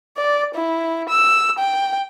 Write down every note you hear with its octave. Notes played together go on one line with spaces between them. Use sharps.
D5
E4
E6
G5